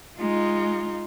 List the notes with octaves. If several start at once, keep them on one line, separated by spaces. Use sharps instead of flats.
G#3 D#4 F4